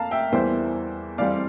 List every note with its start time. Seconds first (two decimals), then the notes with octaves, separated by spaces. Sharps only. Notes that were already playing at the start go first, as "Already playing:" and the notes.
Already playing: F2 A#3 F5 A5 A#5
0.11 E5 G5
0.32 E2 E3 G3 A#3 C5 E5
1.18 F2 E3 G3 C4 D5 F5